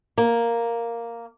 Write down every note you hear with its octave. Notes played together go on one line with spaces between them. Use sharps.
A#3